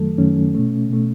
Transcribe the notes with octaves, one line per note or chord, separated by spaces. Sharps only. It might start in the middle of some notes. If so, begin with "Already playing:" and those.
Already playing: F#2 D#3 F#3 A3 A4
F#2 D#3 F#3 A3 C#4
B2 A3
B2 A3